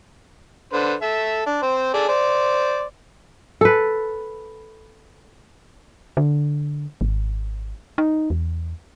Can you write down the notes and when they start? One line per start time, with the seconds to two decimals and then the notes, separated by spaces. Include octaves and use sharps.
0.73 D3 B4 C5
1.02 A4 E5
1.46 D4
1.62 C4 C5
1.94 G#4 A4 D5
2.09 C5 D5
3.61 A4 B4
6.17 D3
7.01 G#1
7.98 D#4
8.30 E2